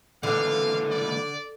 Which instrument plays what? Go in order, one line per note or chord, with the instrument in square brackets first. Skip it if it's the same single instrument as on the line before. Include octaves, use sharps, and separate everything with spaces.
[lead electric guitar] C#2 E3 [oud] D3 [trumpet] F5
[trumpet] D5